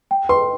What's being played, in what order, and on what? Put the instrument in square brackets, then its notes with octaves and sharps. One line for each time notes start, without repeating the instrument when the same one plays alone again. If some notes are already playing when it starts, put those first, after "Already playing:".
[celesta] G5
[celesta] B4 [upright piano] C6